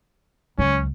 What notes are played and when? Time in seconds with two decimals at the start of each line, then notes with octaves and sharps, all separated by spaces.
0.58 C#2 F#3 C#4